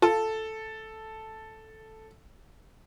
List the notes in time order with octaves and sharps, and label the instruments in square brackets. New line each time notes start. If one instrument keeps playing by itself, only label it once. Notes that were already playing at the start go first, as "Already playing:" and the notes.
[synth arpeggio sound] F4 [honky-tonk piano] A4